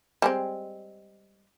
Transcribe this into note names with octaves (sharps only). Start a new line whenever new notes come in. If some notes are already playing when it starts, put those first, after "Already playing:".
G3 G#3 C4